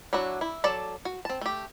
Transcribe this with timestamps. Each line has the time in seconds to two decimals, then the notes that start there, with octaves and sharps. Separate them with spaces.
0.13 F#3 D4 E4 F#4
0.41 E4
0.64 F#3 A4 D5 A5
1.05 F#4
1.25 C4 A5
1.41 A3 G4